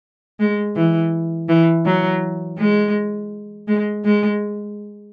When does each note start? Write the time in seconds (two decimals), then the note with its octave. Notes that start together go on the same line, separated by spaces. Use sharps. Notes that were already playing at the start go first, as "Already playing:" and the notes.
0.40 G#3
0.76 E3
1.49 E3
1.85 F#3
2.58 G#3
3.68 G#3
4.05 G#3